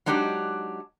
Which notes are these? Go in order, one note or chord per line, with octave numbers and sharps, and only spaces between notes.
F#3 G#3 D4 D#4 G4